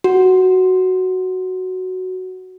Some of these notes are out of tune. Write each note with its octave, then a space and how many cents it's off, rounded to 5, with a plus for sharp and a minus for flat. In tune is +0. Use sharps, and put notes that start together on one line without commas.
F#4 +5